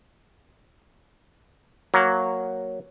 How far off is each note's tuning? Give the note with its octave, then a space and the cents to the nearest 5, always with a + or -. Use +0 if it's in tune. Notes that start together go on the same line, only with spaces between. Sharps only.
F#3 +0 A#3 +0